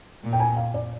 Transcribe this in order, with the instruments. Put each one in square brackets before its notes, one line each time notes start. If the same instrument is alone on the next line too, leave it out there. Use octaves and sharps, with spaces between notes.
[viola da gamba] A#2
[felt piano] G5
G#5
F5
D5